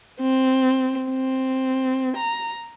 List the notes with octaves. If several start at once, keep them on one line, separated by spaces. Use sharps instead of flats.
C4
C4
A#5